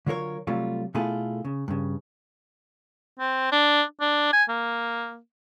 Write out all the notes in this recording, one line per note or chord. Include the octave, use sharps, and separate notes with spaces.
D3 F#3 F4 A#4 C#5
C3 F#3 G3 A3 F4
B2 A3 E4 F4 G#4 A4
C#3
G2 C#3
C4
D4
D4
G#5
A#3